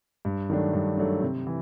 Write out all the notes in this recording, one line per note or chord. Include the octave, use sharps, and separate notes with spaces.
G2
D#3 F#3 A3 D4
G2
D#3 F#3 A3 D4
C3
E3